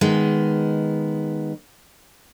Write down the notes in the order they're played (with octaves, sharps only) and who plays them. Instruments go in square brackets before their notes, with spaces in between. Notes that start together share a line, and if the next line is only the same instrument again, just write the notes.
[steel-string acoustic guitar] D#3 G#3 B3